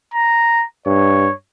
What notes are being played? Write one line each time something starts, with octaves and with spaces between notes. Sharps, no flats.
A#5
G2 C#5